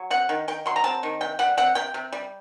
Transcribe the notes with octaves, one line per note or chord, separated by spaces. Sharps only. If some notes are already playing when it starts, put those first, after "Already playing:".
Already playing: F#3
C4 F#5
D#3
D#3 G5
F#3 C6
A#5
C4 A5
D#3
C3 G5
G3 F#5
C4 F#5
C3 G5
C3
G3